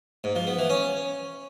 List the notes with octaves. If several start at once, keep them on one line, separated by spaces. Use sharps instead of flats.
G#2
F3
B3
E3
C#4